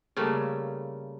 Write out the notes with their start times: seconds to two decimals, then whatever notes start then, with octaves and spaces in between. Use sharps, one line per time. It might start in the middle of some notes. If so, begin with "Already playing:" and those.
0.16 C#3 G3 A3 A#3